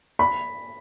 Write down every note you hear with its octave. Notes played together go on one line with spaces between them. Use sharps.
B5